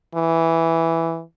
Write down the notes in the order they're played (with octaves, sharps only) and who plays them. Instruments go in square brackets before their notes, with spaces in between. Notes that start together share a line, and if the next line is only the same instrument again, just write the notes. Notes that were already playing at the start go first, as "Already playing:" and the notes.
[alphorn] E3